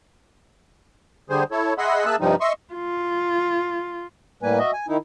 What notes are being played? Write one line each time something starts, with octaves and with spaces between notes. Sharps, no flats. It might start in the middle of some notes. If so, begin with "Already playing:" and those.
D3 G3 G#4 C5
E4 A4 C#5
G#4 D#5 E5 F#5 B5 C6
A#3 G#4 E5 A5 E6 F#6
G2 C3 F3 G3 D#4
D#5 E5 C6 C#6
F4
A2 G3 A#3 B4 G#5
F#4 D#5 E5
G#5
D#3 D#4 E4